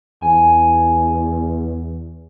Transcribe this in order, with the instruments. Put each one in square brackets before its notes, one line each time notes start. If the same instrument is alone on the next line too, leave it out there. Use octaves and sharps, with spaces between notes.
[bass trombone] E2 [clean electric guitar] G#5